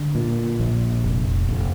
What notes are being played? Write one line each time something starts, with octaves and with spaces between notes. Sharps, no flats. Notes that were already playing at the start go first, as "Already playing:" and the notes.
Already playing: D3
A#2
A#1
F1
F1